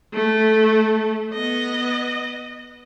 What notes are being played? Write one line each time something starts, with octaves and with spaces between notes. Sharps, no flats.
A3
B3 D#5